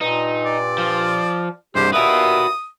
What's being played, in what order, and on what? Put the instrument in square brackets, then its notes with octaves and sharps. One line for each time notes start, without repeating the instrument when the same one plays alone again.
[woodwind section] G2 A#2 [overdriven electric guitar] D#4
[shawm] D5
[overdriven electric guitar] F3
[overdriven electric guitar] C2 G2 [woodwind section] G#3 G4 [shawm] C5
[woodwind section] D#2 A#2 E5 [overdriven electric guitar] F#4 B4 [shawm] D#6